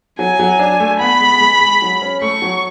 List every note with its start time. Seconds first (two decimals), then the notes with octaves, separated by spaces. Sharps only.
0.19 F#3 G#5
0.40 F#3
0.59 D4
0.80 A3
1.00 B3 B5
1.20 G#3
1.41 G#3
1.61 G#3
1.82 F#3
2.02 C#4
2.22 A3 C#6
2.42 F#3